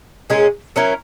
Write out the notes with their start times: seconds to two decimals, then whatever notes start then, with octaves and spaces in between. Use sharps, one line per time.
0.30 A#2 G#3 C#4 G#4
0.76 F#3 C#4 E4 A#4